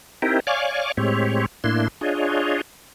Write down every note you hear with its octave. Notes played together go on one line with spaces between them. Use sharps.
C4 D#4 E4 G4 A#4
C#5 D5 F5 G#5 C#6 D6
A2 G#3 C4 G4 C#5
A2 A#3 D4 E4 C6
D4 F4 G#4 C#5 D#5